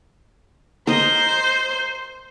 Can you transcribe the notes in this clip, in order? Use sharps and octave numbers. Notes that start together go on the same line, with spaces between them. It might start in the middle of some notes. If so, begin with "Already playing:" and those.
A#4 C5 D#5